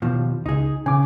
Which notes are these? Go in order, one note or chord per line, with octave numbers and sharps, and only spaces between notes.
D#2 B2 F3
C#2 D#4 G#4
C#3 G#5 D6